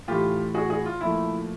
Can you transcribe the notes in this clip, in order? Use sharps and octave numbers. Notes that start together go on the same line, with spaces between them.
A2 E3 A3 F4 G4
F#4 G#4
F#4 G#4
F4
A#2 F3 A3 E4